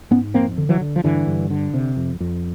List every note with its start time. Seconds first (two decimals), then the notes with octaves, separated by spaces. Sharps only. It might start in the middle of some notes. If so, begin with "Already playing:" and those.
0.11 G#2 B3 C#4
0.34 F2 A#3 C4
0.58 D3
0.69 E3 F#3
0.81 D3
0.96 F3
1.04 G2 D3 E3
1.27 G2
1.50 D3
1.74 C3
1.97 F2
2.20 F2